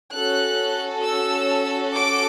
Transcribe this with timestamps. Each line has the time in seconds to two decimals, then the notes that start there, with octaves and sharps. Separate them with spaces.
0.14 C#4 F#4 A4 F#6
1.04 E6
1.94 D6